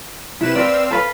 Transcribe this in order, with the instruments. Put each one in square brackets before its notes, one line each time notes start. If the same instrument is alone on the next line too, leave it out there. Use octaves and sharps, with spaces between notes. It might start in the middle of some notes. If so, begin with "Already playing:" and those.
[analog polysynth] C3 B4 E7 [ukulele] E4
[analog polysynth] C4 F5 E6 [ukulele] B4 D5
[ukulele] A4 B4 F5